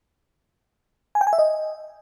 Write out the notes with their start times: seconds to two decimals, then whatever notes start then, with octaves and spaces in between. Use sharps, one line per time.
1.15 G#5
1.21 G5
1.27 G#5
1.33 E5
1.39 D#5